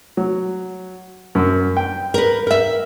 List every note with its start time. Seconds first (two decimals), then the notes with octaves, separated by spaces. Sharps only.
0.17 F#3
1.35 F#2
1.77 G5
2.14 A#4 B4
2.47 A#4 E5